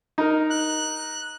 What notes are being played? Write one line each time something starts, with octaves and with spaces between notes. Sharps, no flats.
D#4 A#4
F#6